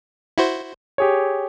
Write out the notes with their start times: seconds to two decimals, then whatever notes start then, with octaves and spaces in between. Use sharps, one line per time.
0.38 E4 F#4 C5
0.98 G4 G#4 C#5